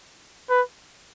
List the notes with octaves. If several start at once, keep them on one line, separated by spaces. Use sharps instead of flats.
B4